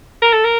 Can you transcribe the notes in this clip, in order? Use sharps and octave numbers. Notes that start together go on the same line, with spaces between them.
A#4
A4
A#4